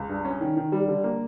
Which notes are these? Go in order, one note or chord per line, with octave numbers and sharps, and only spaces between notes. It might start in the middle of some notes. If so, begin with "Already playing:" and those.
Already playing: C#2
G2
C#4
D#3
D#3
G3
D3
A#3